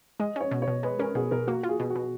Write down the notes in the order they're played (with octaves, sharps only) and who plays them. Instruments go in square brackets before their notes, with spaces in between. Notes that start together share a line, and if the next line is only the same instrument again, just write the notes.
[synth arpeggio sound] G#3 [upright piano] D#5
[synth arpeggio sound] C#4 [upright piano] C#5
[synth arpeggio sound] B2
[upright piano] C#5
[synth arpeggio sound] B2
[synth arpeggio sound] G#3 [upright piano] B4
[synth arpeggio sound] C#4 [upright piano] A#4
[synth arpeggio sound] B2 [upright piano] G#4
[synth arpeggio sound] B2 [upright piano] A#4
[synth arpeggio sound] A#3 [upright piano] F#4
[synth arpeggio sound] F4
[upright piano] G#4
[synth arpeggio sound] B2
[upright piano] F#4
[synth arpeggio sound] B2